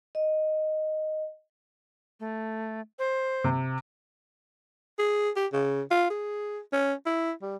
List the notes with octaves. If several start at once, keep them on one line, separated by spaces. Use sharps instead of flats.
D#5
A3
C5
C3
G#4
G4
C#3
F4
G#4
C#4
E4
G3